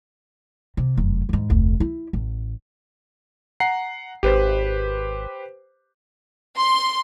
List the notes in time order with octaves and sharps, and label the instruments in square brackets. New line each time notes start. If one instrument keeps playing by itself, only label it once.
[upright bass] C3
F1 F#2
E2 G#2
F1 D2
E4
A1
[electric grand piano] F#5 A#5 C7
[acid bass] G#1 [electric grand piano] G4 B4 C5
[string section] C6